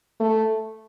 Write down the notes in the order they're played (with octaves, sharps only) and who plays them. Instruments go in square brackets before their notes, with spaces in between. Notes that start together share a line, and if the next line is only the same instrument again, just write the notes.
[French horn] A3